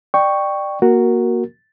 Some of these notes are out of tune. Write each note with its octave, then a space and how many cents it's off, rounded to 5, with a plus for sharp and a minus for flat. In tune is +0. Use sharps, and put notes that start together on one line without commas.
D5 +25 G5 +0 C#6 +0
A#3 +15 F#4 +0 A#4 -5